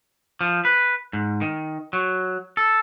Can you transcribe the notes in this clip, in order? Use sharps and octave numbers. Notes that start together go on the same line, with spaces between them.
F3
B4
G#2
D#3
F#3
A4